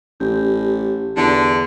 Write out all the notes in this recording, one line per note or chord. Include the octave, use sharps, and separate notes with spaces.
A1 G4
E2 D3